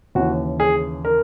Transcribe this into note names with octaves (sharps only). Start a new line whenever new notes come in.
D#2 C#3 E3 F#4
G#4
A#4